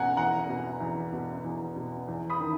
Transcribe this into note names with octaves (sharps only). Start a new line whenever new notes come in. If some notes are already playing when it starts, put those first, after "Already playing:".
Already playing: E2 B2 F#5 G#5 A#5
E2 F#5 A#5
B2
E2
B2
E2
B2
E2
B5 D#6
D#3